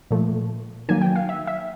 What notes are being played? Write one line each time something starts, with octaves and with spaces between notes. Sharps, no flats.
A#2 F3 A3
D#3 F#3 A#3 G#5
G5
F5
E5
E5